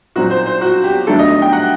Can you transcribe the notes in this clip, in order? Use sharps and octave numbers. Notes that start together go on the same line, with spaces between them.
A#2 F#3 C4 D#4 F#4
C5
C5
F#4
G4
D#3 F#3 A3 D4 A4
D#5
D#5
G5
F#5